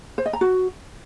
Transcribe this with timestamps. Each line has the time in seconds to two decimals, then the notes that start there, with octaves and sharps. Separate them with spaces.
0.18 C5
0.26 D#5
0.33 A#5
0.41 F#4